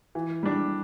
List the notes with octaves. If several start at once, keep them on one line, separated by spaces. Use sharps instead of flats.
E3
G3 D4